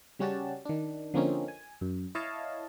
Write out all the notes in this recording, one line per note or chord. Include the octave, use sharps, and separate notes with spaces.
C#3 G3 C#4 F#4 G4 A5
D#3 D4
D3 F3 A#3 C4 C#4 D#4
G#5
F#2
E4 C#5 D#5 F5 A5